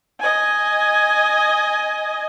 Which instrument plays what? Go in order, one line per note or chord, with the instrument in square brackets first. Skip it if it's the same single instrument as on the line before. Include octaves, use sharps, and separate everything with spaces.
[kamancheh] D#5 G#5